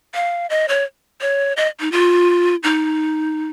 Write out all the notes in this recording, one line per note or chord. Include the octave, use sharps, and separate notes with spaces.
F5
D#5
C#5
C#5
D#5
D#4
F4
D#4